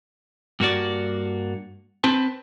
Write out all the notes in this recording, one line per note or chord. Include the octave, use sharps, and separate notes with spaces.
G2 A#3 F#4 D5
C4 B4 A5